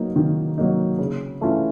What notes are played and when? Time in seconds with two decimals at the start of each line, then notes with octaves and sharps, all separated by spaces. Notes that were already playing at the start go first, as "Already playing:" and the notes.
Already playing: F#3 A#3 D#4
0.16 D#3
0.58 F#3 A#3 D#4
0.99 C#3
1.41 E3 A3 C#4 F4